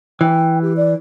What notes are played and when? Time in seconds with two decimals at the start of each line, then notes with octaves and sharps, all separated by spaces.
0.21 E3 G5
0.62 G4
0.77 D5